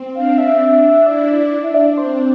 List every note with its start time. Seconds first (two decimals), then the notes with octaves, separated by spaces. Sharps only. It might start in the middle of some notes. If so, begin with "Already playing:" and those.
Already playing: C4
0.15 D4 F5
0.38 E5
1.06 E4 D5
1.30 D5
1.51 D4
1.63 E5
1.74 D5
1.97 C4 C5